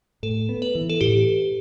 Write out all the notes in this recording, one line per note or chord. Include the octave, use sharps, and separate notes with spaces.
A2 A4
B3
B4
E3
A4
A2 G4